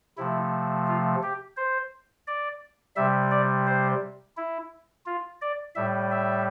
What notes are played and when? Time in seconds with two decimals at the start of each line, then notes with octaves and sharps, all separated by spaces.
0.17 C3 F3 A3 E4
0.88 F4
1.23 G4
1.57 C5
2.27 D5
2.96 C3 G3 E5
3.31 D5
3.67 C5
4.37 E4
5.06 F4
5.42 D5
5.75 A2 G3 E5
6.11 E5